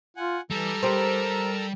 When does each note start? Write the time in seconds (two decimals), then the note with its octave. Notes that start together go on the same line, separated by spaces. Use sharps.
0.16 F4 F#5 G#5
0.51 E3 G3 A4 A#5 E6
0.83 G4 A#4 C5